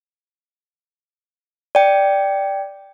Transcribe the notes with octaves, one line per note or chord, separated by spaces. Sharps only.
D5 G5